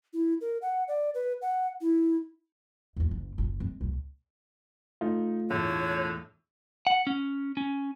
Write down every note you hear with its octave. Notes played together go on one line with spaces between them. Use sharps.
E4
A#4
F#5
D5
B4
F#5
E4
D#2 F4
F#1
F#1 F4
G#3 C4
C#2 A#2
A3 D#4 F4
E1 A2 D3 C#5
F#5
C#4
C#4